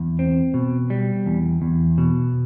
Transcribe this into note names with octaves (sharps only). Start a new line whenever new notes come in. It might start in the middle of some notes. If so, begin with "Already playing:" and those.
Already playing: E2
C4
B2
G3
E2
E2
B2